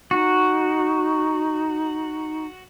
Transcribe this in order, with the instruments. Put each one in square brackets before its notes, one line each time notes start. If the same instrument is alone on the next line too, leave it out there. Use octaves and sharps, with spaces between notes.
[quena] D#4 [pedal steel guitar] F#4